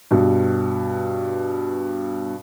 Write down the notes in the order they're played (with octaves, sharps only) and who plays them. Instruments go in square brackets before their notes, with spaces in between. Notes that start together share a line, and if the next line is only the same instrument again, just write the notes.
[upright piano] G2 B2